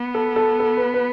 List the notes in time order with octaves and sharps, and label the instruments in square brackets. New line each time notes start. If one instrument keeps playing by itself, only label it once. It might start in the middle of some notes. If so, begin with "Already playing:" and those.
Already playing: [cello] B3
[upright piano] A4
A4
A4
B4
B4